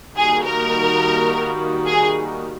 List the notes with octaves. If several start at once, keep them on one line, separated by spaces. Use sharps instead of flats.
D#3 G3 A#3 D#4 F#4 G#4
A#4
G#4